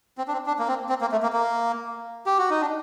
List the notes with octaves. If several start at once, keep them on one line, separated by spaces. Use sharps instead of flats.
C4
D4
C4
D4
A#3
C4
C4
A#3
A3
A#3
A#3
G4
F#4
D#4
D4